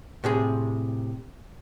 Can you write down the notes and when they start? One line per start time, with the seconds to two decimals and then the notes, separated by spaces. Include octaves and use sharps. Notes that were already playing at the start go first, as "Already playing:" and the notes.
0.24 A2 C3 G#4